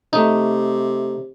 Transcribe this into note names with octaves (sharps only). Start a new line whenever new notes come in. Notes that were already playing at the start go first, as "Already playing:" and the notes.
C3 A3 D#4